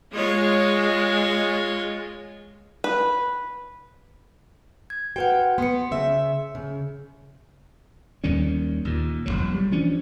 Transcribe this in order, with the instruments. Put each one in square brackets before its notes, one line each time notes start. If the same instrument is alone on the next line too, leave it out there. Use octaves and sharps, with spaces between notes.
[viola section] G#3 [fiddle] F4 C#5
[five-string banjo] B4
[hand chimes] G#6
[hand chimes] F#4 B4 F#5 [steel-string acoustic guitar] G5
[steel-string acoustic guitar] B3 [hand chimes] C6 C#7
[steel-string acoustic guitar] C#3 E5
C#3
[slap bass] D#2 D#3 G3 C#4
D#2 A#2
E1 A#1 F#3
G3
E3 F3 C#4 D4